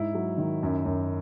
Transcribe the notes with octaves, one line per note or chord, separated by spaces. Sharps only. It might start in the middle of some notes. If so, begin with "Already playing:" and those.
Already playing: G#2 E4
F#3
D#3
F#2
F#2